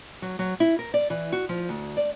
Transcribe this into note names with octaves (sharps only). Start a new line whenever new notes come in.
F#3
F#3
E4
A#4
D5
E3
F#4
F3
D2
D5